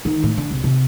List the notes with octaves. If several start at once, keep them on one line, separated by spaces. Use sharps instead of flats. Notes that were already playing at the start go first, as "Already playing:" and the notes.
D#3
A2
D3
C2
C3